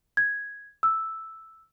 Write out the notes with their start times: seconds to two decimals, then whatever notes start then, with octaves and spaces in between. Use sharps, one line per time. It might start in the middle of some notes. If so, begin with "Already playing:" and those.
0.17 G#6
0.83 E6